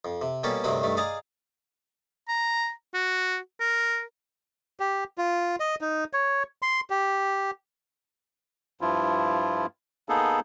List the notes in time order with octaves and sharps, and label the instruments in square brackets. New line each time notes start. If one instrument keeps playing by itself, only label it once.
[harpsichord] F2
C3
B2 G3 A#3 C#4 G4 A4
D2 G2 C3 D#3 F#3 C4
G2 D#3 A3
G#4 D5 D#5 F5 A#5
[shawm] A#5
F#4
A#4
[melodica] G4
F4
D#5
D#4
C#5
C6
G4
[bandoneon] G2 F3 E4 F4
A#3 B3 D#4 G#4 A4